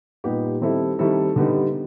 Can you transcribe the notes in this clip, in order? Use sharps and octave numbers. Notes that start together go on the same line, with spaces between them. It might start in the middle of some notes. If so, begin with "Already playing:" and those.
A#2 G3 B3 D#4 G4
D#3 G3 C4 E4 A4
D#3 G3 C4 E4 A4
D3 G3 B3 D#4